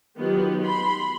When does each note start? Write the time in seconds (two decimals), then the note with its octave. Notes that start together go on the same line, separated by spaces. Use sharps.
0.18 D#3 F#3 B3 F4 G4
0.63 B5 C6